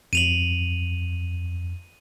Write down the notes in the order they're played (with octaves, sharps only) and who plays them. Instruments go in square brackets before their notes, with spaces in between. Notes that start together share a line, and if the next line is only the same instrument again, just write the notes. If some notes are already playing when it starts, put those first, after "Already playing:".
[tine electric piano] F2 [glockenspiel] D#7 F7 F#7